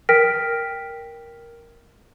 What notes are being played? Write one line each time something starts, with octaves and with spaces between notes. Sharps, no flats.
A#4 G5 F6 A#6 B6 D7